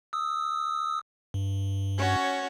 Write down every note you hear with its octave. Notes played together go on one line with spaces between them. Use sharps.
D#6 E6
G2
C#4 F#4 C#5